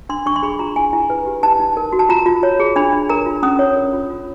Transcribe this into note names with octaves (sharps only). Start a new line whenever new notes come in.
D4 C6
D4 C#6
C6
G#4 B5
F4 A#5
E4 G#5
E4
B4
G4
D#4 A5
D#4
A#4
F#4
A5
F4 A#5
F4
C#5
G#4
D4 B5
D4
A#4 A#5
F4
C#4 D#6
C#5
A#4
F4
F4